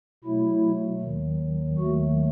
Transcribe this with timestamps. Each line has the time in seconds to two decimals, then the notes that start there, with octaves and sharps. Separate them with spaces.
0.24 B2 F#3 A3 E4
1.01 D#2 D#3 F#3
1.78 D#2 D#3 F#3 A3 F#4